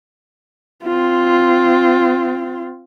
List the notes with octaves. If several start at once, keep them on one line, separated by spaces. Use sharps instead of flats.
C4 F4